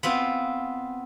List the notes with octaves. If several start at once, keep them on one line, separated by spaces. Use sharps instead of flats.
B3 C4 F4